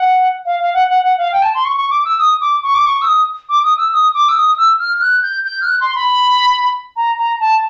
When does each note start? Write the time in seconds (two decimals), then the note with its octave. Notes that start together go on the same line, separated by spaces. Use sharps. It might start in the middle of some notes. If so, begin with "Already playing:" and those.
Already playing: F#5
0.46 F5
0.60 F5
0.74 F#5
0.88 F#5
1.03 F#5
1.18 F5
1.32 G5
1.43 A5
1.54 C6
1.65 C#6
1.76 C#6
1.90 D6
2.05 E6
2.19 D#6
2.41 D6
2.63 C#6
2.75 D6
2.86 C#6
3.01 E6
3.06 D#6
3.49 D6
3.64 D#6
3.78 E6
3.93 D#6
4.14 D6
4.29 E6
4.36 D#6
4.58 E6
4.79 F6
4.94 F6
5.01 F#6
5.23 G6
5.44 G6
5.61 F6
5.66 F#6
5.81 C6
5.95 B5
6.96 A#5
7.18 A#5
7.40 A5